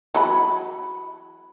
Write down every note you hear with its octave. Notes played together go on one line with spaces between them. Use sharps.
E3 F#3 B5